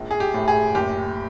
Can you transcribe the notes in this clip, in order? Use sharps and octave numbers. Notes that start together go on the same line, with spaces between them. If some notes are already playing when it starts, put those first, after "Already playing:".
Already playing: A#1 G#2
G#4
G4
A2
G#4
F#1 G4